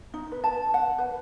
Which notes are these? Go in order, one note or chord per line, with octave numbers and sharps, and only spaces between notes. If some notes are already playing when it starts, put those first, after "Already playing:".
D#4
B4
A5
F#5
B4